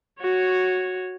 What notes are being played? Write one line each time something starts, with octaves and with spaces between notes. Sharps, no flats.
F#4 C#5